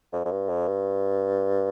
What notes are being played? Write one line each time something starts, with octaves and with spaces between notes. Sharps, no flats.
F2
F2
G2
F2
G2